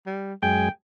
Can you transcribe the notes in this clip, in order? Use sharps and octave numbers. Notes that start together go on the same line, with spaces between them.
G3
F#2 G#3 G5 G#5